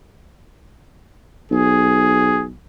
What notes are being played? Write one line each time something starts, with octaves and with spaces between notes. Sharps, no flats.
B1 G#4